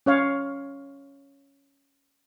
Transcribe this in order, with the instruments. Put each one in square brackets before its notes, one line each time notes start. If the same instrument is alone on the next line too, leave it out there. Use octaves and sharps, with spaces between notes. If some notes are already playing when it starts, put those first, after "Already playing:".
[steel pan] C#4 C#5 F5